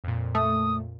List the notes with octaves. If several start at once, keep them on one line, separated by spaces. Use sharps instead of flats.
F2 A#2
A3 D#6